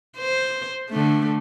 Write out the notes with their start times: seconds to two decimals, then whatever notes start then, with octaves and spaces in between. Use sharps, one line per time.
0.17 C5
0.90 D3 A3